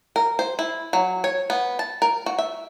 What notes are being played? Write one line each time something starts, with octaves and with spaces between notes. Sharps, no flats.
A#4
C5
E4
F#3
C#5
B3
A5
A#4
F#4
E5